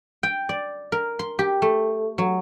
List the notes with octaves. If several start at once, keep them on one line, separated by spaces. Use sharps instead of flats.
G5
D5
A#4
C6
G4
A3
F#3